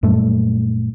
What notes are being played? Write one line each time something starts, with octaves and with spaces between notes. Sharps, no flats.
F#2 A#2 G3 A3